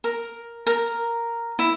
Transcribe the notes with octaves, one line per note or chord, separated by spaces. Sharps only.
A#4
A#4
E4